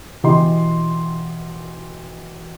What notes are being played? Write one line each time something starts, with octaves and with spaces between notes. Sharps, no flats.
B2 E3 G4 D#5 C6